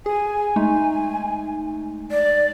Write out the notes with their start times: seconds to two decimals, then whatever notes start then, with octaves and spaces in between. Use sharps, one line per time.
0.06 G#4 G#5
0.56 G#3 A3 D#4
2.11 D5